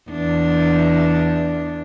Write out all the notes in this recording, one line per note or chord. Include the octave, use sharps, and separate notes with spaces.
E2 D4